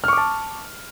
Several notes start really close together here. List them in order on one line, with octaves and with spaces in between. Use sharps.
F6 C#6 D6 A5